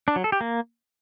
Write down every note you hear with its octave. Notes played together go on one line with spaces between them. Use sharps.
D4
F#3
A4
G4
A#3